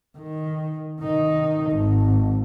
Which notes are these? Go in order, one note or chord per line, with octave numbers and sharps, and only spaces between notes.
D#3
D#3 D#4
G#1